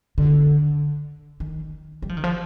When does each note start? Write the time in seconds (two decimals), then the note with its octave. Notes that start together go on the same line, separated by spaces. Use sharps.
0.18 D3
1.40 D#3
2.02 G3
2.09 F3
2.17 D#3
2.24 F3